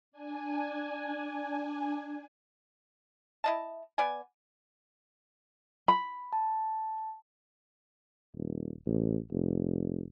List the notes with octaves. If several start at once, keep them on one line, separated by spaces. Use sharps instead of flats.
D4 G#5
E4 D#5 A5
B3 D5 G#5
B5
A5
D#1
A1
F1